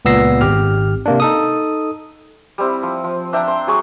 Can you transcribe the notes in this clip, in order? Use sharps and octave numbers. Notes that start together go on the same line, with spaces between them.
C#2 A#2 B3 E6 A#6 C7
G#1 G4 F6
C3 A#3 D4
D#4 A4 D#6
G3 C4 E4
F3
F3
D4 E5 G5 A#5
C6
F#3 G#4 C#6